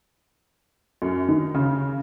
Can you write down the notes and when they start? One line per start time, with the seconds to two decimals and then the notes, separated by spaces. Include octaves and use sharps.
1.02 F#2
1.28 D#3
1.54 C#3